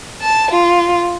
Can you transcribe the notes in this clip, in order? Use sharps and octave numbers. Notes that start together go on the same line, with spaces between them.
A5
F4